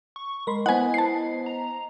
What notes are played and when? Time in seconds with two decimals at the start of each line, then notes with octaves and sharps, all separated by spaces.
0.16 C#6
0.47 G#3 A#4 B5 C6
0.66 B3 E4 C5 D#5 F#5 G#5
0.94 A5 C7
1.46 A#5